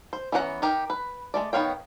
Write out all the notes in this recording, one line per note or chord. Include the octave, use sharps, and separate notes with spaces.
C5
E3 B3 C#4 F#5 A#5
D#4 G4 A#4
B4
G#3 A3 D5
D#3 B3 C#5 F5 G5